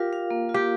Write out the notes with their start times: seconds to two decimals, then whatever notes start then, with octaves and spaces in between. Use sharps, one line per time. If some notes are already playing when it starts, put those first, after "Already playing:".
Already playing: F4 G4 A#4 F5
0.13 F5
0.31 A#3
0.49 F4
0.54 G4